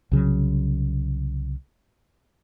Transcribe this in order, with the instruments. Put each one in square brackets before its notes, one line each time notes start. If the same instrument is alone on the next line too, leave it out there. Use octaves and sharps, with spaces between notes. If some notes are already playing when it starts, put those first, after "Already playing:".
[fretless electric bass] C2 C#3 F#3